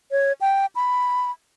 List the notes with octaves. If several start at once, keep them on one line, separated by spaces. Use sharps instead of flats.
C#5
G5
B5